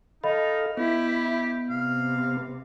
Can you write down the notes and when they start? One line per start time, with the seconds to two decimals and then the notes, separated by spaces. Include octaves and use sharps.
0.24 D#4 A4 D#5 F5 B5
0.77 B3 E4 G4
1.70 C3 F5